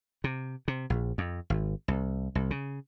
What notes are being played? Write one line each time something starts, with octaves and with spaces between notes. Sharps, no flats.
C3
C3
A#1
F2
G#1
C2
C2
C#3